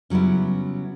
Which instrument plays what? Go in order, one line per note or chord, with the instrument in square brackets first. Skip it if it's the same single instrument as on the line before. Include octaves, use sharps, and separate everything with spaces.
[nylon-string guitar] C#3 F#3 G3 B3 E4